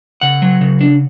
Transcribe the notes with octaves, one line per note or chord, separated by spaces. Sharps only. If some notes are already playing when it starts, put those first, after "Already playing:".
C#3 F#5
F#3
C#3
D4